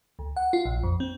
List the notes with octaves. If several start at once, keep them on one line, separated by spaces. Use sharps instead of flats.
D2
F#5
F4
A#1
F2
C4